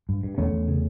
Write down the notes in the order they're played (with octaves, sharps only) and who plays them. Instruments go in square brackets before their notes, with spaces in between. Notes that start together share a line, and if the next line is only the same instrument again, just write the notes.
[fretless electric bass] G2
G2
E2 A3 C#4
E2
C#3